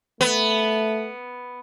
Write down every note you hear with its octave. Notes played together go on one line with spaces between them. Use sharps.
A3 B3